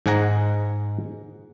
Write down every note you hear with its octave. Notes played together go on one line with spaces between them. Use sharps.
G#2 G#3 G#4 F#5 A#5